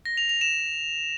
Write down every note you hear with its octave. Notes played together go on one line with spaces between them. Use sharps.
A#6
F7
F7
E7